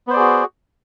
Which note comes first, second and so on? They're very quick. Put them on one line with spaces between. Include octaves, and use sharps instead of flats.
B3 C5 D5 G#4 F#4